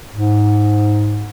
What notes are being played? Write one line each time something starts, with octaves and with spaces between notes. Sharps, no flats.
G#2